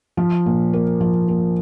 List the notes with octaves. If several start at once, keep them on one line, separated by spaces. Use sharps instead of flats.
F3
A#2
A#3
F3
A#3